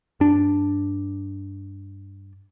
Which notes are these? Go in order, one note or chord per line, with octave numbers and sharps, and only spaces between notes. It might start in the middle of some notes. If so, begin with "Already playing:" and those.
G2 D4